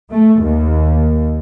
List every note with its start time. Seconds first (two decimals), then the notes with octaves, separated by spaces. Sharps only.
0.12 A3
0.43 D#2